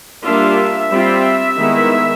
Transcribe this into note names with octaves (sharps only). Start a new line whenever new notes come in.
G3 A#3 D4 F4 E5
G3 C4 F4
D#3 G#3 B3 E4